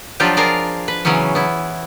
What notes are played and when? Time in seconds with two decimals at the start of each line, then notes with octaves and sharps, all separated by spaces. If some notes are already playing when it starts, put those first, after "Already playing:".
0.20 F3 F#3 D4 F4 G4
0.37 F4 G#4 A#4 D5 F5
0.88 B4
1.05 C#3 E3 F#3 B3 C#4
1.35 B3 E4